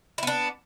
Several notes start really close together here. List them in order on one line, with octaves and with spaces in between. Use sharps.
E4 B3 D4